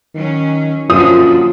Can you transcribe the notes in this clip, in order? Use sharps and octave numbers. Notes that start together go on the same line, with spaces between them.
D#3 F#3 C#4
F#2 A#2 D3 F3 F4 D#6